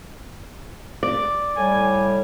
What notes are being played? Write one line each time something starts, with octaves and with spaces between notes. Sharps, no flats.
D5
A2 G3 G#5